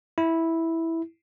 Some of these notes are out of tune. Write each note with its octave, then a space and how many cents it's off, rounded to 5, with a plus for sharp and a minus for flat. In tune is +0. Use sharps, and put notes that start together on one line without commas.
E4 -5